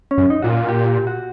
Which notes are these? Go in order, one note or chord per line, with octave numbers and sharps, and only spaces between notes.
C#4
F#2
D#4
A#2 F#4
F4
G4
F#4